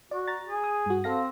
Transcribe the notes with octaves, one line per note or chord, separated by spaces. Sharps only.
F#4 D5
A#5 A6
G#4
D#6
G2 F#4
C4 A4 F5 A#6